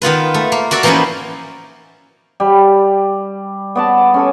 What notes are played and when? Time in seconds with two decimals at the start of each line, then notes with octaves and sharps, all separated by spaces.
0.02 D#3 B3 F4 B4
0.34 A3
0.52 A#3
0.71 F#4 A#4 D5 E5
0.83 E3 F3 A#3 B3 C#4 D#4
2.40 G3
3.75 B3 D5 A5
4.14 C#4 A4 G#5